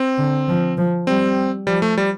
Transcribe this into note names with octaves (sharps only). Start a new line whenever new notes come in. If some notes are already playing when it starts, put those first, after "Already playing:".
Already playing: C4
D3
F3
F3
G3 C4
F3 G3
A3
G3